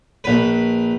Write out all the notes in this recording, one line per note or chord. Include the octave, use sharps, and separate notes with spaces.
A#1 B4